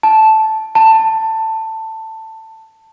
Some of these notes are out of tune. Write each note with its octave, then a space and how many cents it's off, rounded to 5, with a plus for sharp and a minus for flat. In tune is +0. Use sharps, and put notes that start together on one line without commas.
A5 -10
A5 +15